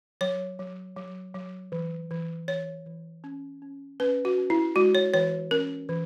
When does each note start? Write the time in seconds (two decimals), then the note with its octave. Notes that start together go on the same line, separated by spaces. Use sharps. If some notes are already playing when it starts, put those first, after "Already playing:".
0.21 F#3 C#5
0.59 F#3
0.96 F#3
1.34 F#3
1.72 E3
2.11 E3
2.48 E3 C#5
2.86 E3
3.24 C#4
3.62 C#4
4.00 C#4 B4
4.25 F#4
4.38 C#4
4.50 E4
4.76 G#3 F#4
4.95 C#5
5.14 E3 C#5
5.51 C#4 A#4
5.89 E3